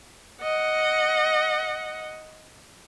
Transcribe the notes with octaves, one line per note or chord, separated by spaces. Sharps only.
D#5 F#5